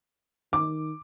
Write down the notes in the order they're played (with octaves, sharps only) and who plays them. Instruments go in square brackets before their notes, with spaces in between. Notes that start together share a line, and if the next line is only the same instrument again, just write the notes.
[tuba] D#3 [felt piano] D6